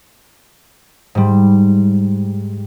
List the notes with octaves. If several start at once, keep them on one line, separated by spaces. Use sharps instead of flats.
G#2 G3